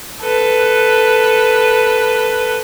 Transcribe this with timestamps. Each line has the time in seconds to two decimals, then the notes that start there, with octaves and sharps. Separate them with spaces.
0.22 A4 B4